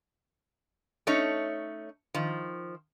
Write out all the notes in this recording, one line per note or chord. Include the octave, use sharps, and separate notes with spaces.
A3 C#4 D#4 C#5
D#3 F3